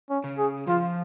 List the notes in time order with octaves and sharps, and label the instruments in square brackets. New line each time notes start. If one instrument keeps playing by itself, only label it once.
[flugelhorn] C#4
[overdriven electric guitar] C#3
[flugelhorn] G#4
[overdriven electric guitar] F3 [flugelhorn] F4